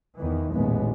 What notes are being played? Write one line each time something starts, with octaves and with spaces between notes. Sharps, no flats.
E2 D#3 E3
A1 D#2 A#2 G#3 B3